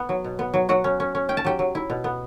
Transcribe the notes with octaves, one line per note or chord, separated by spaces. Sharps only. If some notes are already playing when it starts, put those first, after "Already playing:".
Already playing: B3
F#3
B2
B3
F#3
F#3 F#4 F#5
C#4
C#4
C#4
C#4 G5
A5
F#3 G4 G5
F#3
E4
B2
B3